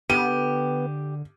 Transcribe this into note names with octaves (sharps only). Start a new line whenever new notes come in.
D3 B3 G4 D#7